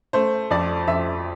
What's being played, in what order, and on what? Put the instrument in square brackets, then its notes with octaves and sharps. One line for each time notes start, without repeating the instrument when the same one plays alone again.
[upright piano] A3 C5
F2 D5
F2 E5